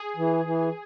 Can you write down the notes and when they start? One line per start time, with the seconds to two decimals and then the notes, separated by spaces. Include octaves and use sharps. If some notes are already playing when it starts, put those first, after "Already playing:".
Already playing: G#4
0.17 E3
0.45 E3